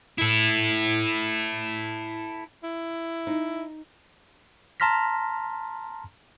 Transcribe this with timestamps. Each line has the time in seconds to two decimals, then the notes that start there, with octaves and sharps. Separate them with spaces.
0.18 E4 A4
2.64 E4
3.27 D#4
4.80 A5 A#5 C6 F6 A#6 B6